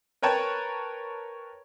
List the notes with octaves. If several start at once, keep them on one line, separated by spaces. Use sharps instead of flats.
A#4 B4 C#5 G5 A5